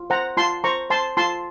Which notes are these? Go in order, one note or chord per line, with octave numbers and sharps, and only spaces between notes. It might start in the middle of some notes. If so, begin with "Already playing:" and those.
Already playing: F4
C5 F#5 A#5
F4 A5 C6
C5 A#5 C#6
C5 A5 C6
F4 A5 C6